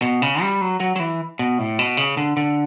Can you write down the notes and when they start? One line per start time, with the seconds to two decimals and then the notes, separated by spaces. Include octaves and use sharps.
0.02 B2
0.22 C#3
0.42 G3
0.61 F#3
0.80 F#3
0.96 F#3
1.00 E3
1.39 B2
1.58 A2
1.79 B2
1.97 C#3
2.17 D3
2.37 D3